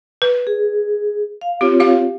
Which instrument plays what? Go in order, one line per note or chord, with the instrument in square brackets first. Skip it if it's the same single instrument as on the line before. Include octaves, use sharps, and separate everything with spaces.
[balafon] B4
[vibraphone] G#4
F5
[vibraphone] C4 F4 C#5 [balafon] G4
[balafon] G4 F5